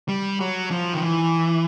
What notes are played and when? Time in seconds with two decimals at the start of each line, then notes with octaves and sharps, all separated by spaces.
0.08 G3
0.40 F#3
0.71 F3
0.94 D#3
1.03 E3